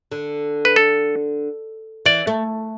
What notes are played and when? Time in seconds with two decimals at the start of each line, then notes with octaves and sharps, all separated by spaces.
0.12 D3
0.65 B4
0.76 A4
2.06 E3 D5
2.27 A3